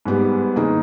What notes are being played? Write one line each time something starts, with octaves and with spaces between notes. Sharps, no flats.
G#2 G3 B3 G4
D#3 A#3 D#4 G#4